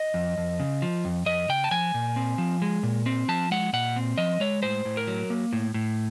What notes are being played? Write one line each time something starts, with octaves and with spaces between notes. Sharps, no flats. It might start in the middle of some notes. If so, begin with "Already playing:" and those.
Already playing: D#5
F2
F2
C#3
F3
F2
F2 D#5
C#3 G5
A5
F3 G#5
A#2
C4
F3
G#3
A#2
C4
F3 A5
G#3 F#5
A#2 F#5
C4
F3 D#5
G#3 C#5
A2 C5
A2
A#4
F#3
A#3
A2
A2